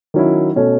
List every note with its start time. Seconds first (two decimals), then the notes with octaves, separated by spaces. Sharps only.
0.14 D#3 F#3 C#4 E4
0.56 B2 A3 C#4